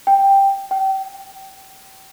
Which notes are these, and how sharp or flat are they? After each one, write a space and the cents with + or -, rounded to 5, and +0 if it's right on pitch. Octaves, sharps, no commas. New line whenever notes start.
G5 +5
G5 -30